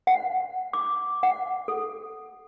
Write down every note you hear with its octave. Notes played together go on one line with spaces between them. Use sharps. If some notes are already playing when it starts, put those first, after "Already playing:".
F#5
D6
F#5
A4